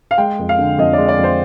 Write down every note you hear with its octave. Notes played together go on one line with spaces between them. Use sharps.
F5
G#3 G5
F2
F5
D3
F2 D#5
D5
G#3
D5
F2
C5